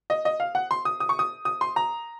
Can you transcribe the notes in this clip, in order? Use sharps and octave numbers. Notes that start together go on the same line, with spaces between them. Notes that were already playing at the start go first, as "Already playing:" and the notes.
D#5
D#5
F5
F#5
C6
D#6
D#6
C#6
D#6
D#6
C6
A#5